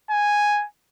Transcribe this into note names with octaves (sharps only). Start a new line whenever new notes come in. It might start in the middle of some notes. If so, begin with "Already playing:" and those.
G#5